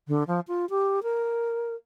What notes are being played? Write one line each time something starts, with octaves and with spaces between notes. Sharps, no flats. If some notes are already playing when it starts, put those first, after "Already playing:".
D3
F3
F4
G4
A#4